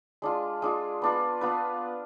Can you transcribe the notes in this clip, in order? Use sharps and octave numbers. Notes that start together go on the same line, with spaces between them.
G#3 D4 F4
G#3 D4 F4
B3 D4 F4 B4
B3 D4 F4 B4